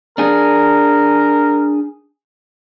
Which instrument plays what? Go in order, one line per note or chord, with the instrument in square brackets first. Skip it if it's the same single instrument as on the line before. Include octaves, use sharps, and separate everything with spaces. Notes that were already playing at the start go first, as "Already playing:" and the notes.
[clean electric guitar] D4 G#4 [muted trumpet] A#4